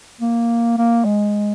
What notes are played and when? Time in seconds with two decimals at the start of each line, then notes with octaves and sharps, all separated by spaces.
0.21 A#3
0.77 A#3
1.05 G#3